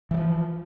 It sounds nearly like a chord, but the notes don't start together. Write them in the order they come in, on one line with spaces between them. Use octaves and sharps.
E3 G3 F3